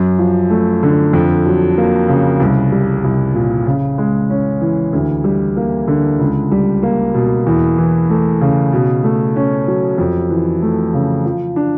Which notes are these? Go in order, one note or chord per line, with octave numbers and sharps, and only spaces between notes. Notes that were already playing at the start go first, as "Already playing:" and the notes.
Already playing: F#2
F3
A3
D3
F2
F#3
A#3
C#3
C2
G3
C2
A#2
C#3
G#3
C#4
E3
D2
G3
A#3
D3
C#2
G3
A#3
B2
E2
E3
A3
C#3
B2
A3
C#4
F#3
F2
E3
A3
C#3
F3
D4